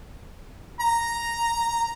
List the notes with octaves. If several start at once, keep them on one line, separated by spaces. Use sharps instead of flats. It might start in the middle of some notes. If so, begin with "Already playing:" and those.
A#5